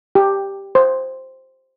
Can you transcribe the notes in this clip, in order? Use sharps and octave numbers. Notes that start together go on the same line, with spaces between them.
G4
C5